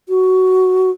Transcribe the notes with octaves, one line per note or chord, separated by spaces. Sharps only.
F#4